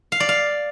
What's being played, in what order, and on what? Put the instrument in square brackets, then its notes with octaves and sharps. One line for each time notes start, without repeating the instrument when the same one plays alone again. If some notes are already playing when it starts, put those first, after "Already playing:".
[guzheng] F5
D5
F5